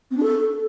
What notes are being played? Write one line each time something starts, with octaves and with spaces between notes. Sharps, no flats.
C4
D4
A4